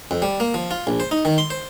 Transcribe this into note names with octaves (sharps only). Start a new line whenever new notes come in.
F2
G3
A#3
F3
F4
A#1
C5
D#4
D#3
C6
C5